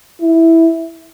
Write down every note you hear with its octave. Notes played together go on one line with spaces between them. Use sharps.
E4